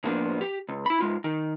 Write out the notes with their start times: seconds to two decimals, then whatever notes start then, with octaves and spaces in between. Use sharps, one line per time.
0.04 A2 F3 A#3 B3 D4
0.41 G4
0.69 C#2
0.86 E4 B5
1.00 G#2 G#3 F4
1.24 D#3